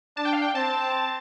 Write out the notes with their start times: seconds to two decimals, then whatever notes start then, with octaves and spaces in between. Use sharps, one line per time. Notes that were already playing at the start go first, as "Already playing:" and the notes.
0.17 D4 A5
0.25 G5
0.33 F5
0.42 G5
0.54 C4 A5